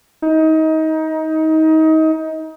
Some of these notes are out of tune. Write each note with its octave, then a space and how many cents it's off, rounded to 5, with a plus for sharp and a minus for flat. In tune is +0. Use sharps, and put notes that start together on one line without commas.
D#4 +25